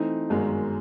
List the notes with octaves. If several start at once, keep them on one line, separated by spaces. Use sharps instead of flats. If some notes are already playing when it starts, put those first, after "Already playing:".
Already playing: E3 A3 C4 D#4
G1 F#2 D#3 G#3